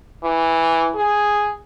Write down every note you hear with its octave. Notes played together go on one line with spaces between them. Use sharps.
E3
G#4